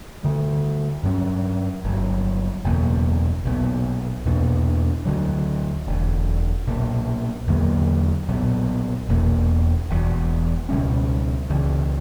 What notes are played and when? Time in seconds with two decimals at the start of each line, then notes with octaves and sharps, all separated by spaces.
0.23 D2 D3 G3
1.03 G2 F#3 C#4
1.84 G1 G2 F#3
2.64 F#1 E2 B2 A#3
3.45 B1 A#2 F#3 B3
4.25 E2 B2 A#3 D4
5.05 D2 D3 F#3
5.86 E1 D2 D3
6.67 B1 A#2 A#3
7.47 E2 D3 F#3 A#3
8.28 B1 A#2 F#3 B3
9.08 E1 E2 B2 A#3
9.89 E1 E2 B2
10.69 C#2 B2 G3 C#4
11.50 C#2 C#3 E3